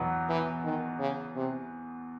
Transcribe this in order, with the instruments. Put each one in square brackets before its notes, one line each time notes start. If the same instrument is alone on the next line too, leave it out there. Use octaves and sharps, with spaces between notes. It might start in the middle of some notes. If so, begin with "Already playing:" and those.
Already playing: [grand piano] E2 B2 F#3 B3
[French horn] E3
D#3
C#3
C3